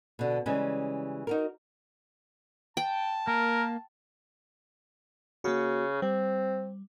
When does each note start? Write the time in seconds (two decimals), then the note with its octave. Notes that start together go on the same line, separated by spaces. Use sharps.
0.19 B2 D3
0.46 C#3 E3 G3 G#3 C#4
1.27 D#4 F#4 A#4
2.77 G5 A5
3.27 A#3 A#4
5.44 C#3 A#3 F#4
6.02 G3 C4